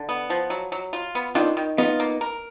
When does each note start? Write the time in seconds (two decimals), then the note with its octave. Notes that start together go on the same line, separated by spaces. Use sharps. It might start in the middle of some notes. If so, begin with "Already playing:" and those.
Already playing: D3
0.09 B3
0.30 F3
0.50 F#3
0.72 F#3
0.93 F4
1.15 B3
1.35 D#3 D4 F4
1.57 D#3
1.78 B3 D#4 F4
2.00 A#3
2.21 A#4